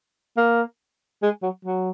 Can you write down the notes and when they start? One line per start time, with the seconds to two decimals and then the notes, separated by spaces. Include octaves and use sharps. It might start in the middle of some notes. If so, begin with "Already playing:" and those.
0.37 A#3
1.22 G#3
1.42 F#3
1.65 F#3